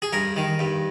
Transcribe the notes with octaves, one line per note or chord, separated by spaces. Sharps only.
G#4
G2 A#4
D#3
G2